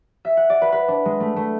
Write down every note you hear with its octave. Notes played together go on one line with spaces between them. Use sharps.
E5
F#5
D5
B4
B4
D4
G#3
A3
A3